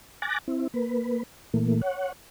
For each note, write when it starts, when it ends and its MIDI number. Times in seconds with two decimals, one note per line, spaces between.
0.22 0.38 80
0.22 0.38 86
0.22 0.38 90
0.22 0.38 93
0.22 0.38 94
0.48 0.67 60
0.48 0.67 64
0.74 1.23 58
0.74 1.23 71
1.54 1.81 46
1.54 1.81 52
1.54 1.81 57
1.54 1.81 58
1.81 2.12 73
1.81 2.12 78